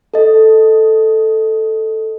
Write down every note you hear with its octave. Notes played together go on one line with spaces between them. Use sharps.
A4 D#5